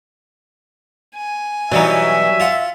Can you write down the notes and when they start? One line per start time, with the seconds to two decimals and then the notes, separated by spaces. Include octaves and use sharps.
1.17 G#5
1.72 B2 E3 F#3 G3 B3 D#4 E5
2.40 F4 F#5